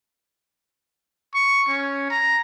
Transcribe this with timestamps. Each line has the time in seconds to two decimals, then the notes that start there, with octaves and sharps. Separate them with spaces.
1.34 C#6
1.68 C#4
2.10 A#5